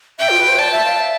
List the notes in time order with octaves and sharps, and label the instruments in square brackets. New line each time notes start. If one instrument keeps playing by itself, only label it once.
[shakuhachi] E5 [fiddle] G5
[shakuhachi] F4
B4
C5
[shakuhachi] D5 [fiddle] A5
[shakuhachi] E5
F5
E5